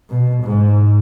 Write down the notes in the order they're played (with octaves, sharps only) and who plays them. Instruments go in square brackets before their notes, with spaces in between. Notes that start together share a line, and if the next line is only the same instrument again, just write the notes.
[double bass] B2
G#2